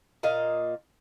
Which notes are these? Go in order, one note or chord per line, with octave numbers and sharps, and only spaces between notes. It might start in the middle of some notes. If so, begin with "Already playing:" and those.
A#2 D#5 F5